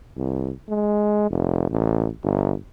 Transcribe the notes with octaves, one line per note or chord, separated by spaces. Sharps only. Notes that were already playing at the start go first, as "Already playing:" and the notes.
C2
G#3
F1
A1
G1